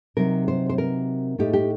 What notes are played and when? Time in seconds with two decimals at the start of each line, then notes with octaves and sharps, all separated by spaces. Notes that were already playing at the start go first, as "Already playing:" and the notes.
0.17 C3 F#3 C4 D#4 A#4
0.48 C5
0.69 C5
0.78 A#4
1.38 A2 A3 D#4 G4
1.53 G4